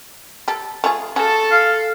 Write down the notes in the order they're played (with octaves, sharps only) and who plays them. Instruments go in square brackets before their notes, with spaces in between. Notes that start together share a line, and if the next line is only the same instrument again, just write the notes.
[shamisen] G4 A4
A3 F4 G#4
[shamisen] C#3 C#4 F#4 [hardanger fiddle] A4 A5
[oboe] F5